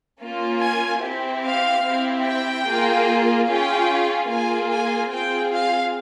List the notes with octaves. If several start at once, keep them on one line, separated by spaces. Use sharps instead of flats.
A#3 C#4 F4
G#5
C4 E4 G4
F5
C4 E4 G4
G5
A#3 F4 G#4
C#4 F4 G#4 G5
A#3 F4 G#4 G#5
G#5
C4 F4 G#4 G5
F5